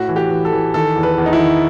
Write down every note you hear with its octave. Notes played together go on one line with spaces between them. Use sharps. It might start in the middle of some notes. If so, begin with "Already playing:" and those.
Already playing: A2 F#4
E3
G4
E3
A4
E3
D#3 A4
E2
B4
E2
D#4
E4
D#3